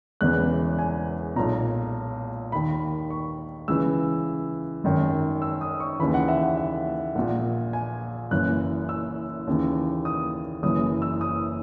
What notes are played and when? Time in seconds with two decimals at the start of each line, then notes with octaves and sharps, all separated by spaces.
0.21 E1 E2 C#3 E3 F#6
0.79 G#5
1.36 B1 A#2 A#5
2.52 D#2 D#3 B5
3.10 C#6
3.68 C#2 C#3 E3 E6
4.84 G#1 F#2 D#3
5.42 E6
5.61 D#6
5.80 C#6
5.99 D#2 C#3 E3 B5
6.14 F#5
6.28 E5
6.43 F#5
6.57 E5
7.15 A#1 A#2 F#5
7.73 G#5
8.31 F#1 F#2 E3 F#6
8.89 E6
9.47 D#2 C#3 E3
10.05 D#6
10.63 F#1 F#2 E3 D#6
11.02 E6
11.21 D#6